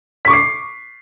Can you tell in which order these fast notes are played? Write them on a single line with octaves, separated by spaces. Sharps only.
B6 C#6 D6 C7